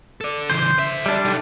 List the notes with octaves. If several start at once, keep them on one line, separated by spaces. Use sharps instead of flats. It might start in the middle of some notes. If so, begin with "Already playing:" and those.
A4 D5
C#3 E3 C5
D3 E5
G3 D4
D#4 A4